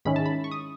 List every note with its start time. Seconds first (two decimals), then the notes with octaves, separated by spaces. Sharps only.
0.05 G#2 D#3 G#3 C#4 E4 B5
0.16 A5
0.26 B5
0.44 C#6
0.51 D#6